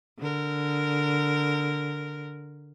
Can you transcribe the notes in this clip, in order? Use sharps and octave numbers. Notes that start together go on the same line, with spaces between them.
D3 A#4